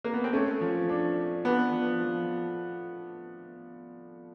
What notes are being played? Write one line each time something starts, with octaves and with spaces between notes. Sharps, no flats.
A#3
B3
C4
A3 C#4
F3
D4
D4
B3 D4
F3
F3